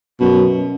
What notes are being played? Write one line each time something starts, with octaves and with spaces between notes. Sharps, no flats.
F#2 B2